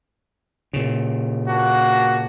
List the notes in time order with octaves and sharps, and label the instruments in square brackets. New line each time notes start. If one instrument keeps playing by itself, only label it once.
[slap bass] A#2 C#3
[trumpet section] A#3 D4 F#4